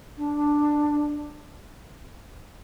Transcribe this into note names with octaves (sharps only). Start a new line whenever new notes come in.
D4